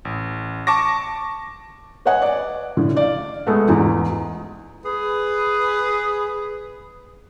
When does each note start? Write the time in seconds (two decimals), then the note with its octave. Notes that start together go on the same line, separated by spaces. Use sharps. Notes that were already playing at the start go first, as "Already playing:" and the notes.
0.05 A1
0.67 A5 C#6 D6 A#6
2.05 B4 C#5 D#5 F#5 G#5
2.22 D5
2.77 A2 D3
2.97 D5 F5
3.46 G#3 A3 B3
3.68 E2 G#2
4.84 G#4 B4